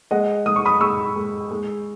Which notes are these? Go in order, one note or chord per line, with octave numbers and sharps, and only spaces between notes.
G#3 D#5 F#5
G#3 D#6
C#6
B5 D#6
G#3 C#6 E6
G#3
G#3